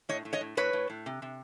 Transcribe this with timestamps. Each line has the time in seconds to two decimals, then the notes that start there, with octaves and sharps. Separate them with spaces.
0.09 A2 C#5 D#5
0.25 A2
0.33 C#5 D#5
0.41 A2
0.57 A2 B4 C#5
0.73 A2
0.90 A2
1.06 C3
1.22 C3